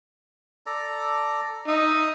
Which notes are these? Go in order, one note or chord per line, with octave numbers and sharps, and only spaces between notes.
A4 D5 A#5
D#4 E5 D#6